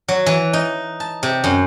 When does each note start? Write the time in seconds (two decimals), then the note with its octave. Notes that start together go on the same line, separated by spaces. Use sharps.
0.08 F#3
0.26 E3
0.53 D#4
1.00 A5
1.23 C3
1.44 F#2